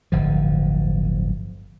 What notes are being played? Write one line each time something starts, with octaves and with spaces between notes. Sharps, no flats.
D1 G1 F3